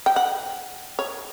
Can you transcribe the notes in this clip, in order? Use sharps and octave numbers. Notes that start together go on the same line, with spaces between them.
G5
F#5
C#5